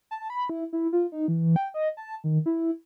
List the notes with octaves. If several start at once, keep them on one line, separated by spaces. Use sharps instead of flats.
A5
B5
E4
E4
F4
D#4
E3
G5
D#5
A5
D#3
E4